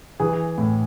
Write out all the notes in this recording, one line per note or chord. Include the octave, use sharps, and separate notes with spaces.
E3 G#4
A2